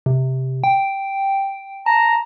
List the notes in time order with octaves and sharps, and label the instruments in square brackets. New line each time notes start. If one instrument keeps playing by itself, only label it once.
[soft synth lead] C3
G5
[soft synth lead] A5 [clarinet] A#5